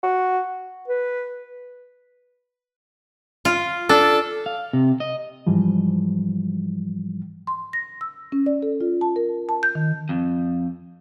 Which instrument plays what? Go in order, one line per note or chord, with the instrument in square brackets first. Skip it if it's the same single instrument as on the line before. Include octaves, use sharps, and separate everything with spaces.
[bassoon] F#4
[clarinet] B4
[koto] F4
[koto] D4 [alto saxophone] A4
[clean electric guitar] F5
C3
D#5
[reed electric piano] G#2 E3 F3 G3
[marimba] C6
A#6
E6
C#4
D5
A4
F4
A5
A#4
A5
G6
D#3
[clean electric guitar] F2